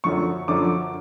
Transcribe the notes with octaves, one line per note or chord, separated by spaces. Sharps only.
F#2 D3 F3 C#6
F#2 D3 F3 D6